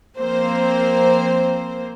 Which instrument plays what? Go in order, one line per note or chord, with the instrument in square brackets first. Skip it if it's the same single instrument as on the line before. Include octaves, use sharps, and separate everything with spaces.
[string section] F3 A#3 C4 C5